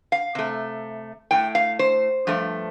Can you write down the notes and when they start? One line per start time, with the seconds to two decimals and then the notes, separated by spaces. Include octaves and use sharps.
0.12 F5
0.35 C3 A3
1.31 A2 A3 G5
1.55 F5
1.79 C5
2.27 G2 F3 A3